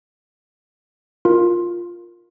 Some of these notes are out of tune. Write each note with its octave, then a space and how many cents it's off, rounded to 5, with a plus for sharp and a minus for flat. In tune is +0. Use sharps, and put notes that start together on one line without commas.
F4 +0 A#4 +0